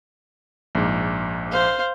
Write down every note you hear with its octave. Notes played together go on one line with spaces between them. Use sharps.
A#1 G#2
C5 F5